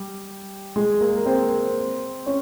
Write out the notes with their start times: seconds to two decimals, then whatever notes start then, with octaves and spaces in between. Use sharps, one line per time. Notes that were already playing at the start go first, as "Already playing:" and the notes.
Already playing: G3 G4
0.76 G#3 G#4
1.01 A#3 A#4
1.17 A#4
1.26 C4 C5
2.26 C#4 C#5